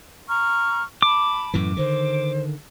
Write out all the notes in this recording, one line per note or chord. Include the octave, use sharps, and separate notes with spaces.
A#5 C#6 F6
A5 B5 D6
F#2 A2 E3
D3 D#3 C5